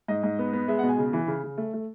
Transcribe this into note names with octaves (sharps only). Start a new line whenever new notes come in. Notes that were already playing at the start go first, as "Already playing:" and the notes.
G#2 D#5
G#2
B3
B3
G#3 E5
B2 F#5
G#5
C#3
E3
C#3
C#3
A3
A3